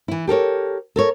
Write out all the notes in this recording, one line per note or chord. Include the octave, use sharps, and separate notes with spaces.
E3 E4
G4 A4 A#4 C#5
A4 A#4 C#5